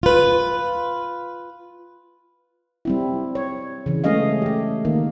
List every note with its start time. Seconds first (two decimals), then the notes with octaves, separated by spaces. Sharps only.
0.03 F4 B4
2.85 G3 C4 E4
3.35 C#5
3.86 C#3 E3
4.04 G#3 A3 C#4 G#4 D#5 F5
4.42 A3 G4
4.85 D#3 A#3